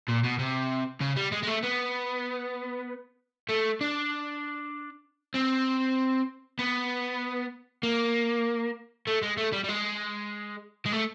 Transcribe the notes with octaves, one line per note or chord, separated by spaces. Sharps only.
A#2
B2
C3
C#3
G3
G#3
G#3
A3
B3
A3
D4
C4
B3
A#3
A3
G#3
A3
G3
G3
G#3
G#3
A3